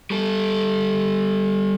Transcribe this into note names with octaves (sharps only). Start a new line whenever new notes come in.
G3 A4